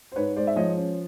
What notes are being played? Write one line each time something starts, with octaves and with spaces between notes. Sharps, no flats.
C5
G#2 B4 C#5
G#3 C5 D5
E5
F3 C#5 D#5
C#4